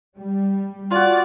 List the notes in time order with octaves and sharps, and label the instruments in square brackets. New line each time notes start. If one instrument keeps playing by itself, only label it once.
[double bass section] G3
[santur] F4 F#4 [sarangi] D5